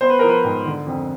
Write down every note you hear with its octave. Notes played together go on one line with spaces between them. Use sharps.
B3 C5
B4
F3 A#4
B4
G#2
D3
F2